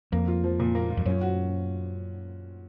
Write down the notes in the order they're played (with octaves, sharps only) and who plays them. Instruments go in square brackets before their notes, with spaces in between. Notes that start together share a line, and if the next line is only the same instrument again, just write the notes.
[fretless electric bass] F2 [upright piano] A#3
[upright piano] F4
F3
A#2
A#3
F4
[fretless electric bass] F2
[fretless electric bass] F#2 [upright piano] C#4
[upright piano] F#4